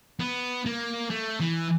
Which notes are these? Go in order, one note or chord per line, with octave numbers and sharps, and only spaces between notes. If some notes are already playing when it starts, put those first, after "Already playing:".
B3
A#3
A3
E3